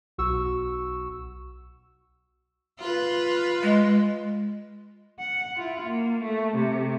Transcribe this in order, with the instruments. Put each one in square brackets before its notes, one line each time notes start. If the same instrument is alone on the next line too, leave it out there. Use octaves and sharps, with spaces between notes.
[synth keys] B1 F#4 C#6 E6
[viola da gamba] F4 B4
[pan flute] G#3
[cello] F#5
E4 F4
A#3
A3
C3 A3